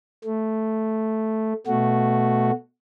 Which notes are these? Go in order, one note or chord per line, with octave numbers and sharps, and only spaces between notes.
A3
B2 A3 F#4